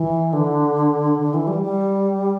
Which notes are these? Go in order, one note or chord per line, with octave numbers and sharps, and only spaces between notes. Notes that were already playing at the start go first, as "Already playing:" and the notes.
Already playing: E3
D3
D3
E3
G3
G3